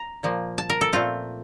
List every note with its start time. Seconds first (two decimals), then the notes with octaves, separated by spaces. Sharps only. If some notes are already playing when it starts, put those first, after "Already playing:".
Already playing: A#5
0.23 A#2 F3 A#3
0.58 A5
0.70 A#4
0.81 A4
0.93 A#2 A3 C4 F4